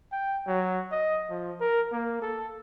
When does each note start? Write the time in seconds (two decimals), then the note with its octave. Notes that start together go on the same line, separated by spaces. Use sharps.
0.12 G5
0.47 F#3
0.92 D#5
1.30 F3
1.61 A#4
1.92 A#3
2.22 A4